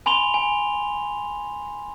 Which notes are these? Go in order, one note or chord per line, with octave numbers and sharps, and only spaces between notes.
G#5 B5 C6 F7 G7
G#5